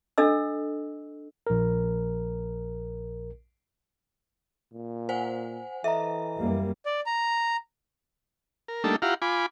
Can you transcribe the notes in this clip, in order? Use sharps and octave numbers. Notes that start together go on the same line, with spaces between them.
D4 A4 D#5 E6
A#1 A#4
A#2
C5 F#5 G#5
E3 A4 D#5 E5 A#5
F#2 G3 A#3
D5
A#5
A#4
G3 A3 A#3 D4 D#4 A4
E4 F4 G4 F5 F#5 A#5
F4 G#5 B5 D6